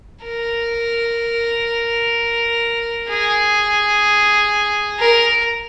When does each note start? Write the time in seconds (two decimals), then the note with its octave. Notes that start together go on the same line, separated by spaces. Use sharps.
0.25 A#4
3.10 G#4
5.00 A#4